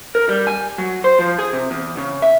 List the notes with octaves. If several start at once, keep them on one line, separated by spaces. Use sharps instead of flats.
A#4
G3
G#5
F#3
C5
F3
G#4
C3
E2
C#3
E5